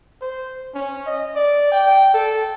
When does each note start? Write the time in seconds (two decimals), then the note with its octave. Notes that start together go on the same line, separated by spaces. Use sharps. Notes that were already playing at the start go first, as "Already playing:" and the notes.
0.21 C5
0.74 C#4
1.06 D#5
1.35 D5
1.72 G5
2.14 A4